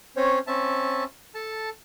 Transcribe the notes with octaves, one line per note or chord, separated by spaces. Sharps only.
C4 C#4 C5 C#5
C4 C#4 E5 A5
A4 A5